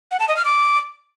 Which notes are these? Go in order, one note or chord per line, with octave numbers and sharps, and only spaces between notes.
F#5
A5
D#5
F6
D6